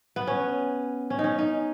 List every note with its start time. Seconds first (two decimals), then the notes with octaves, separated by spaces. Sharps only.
0.16 B3
0.27 C#4
1.10 C#4
1.19 D#4
1.24 C#4
1.38 D#4